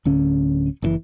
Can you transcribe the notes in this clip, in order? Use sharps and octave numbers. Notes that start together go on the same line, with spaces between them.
D1 D3 C#4
F#1 C#3 E3